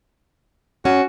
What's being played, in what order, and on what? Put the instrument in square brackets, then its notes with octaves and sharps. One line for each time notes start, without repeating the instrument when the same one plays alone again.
[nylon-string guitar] C#4 [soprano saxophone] F#4